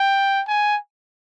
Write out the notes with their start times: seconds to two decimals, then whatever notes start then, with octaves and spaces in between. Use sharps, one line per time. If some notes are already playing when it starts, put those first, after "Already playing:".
Already playing: G5
0.48 G#5